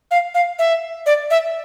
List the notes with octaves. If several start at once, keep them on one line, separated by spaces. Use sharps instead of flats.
F5
F5
E5
D5
E5